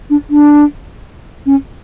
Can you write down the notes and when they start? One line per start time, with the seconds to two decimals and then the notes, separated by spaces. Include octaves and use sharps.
0.10 D4
0.30 D4
1.46 C#4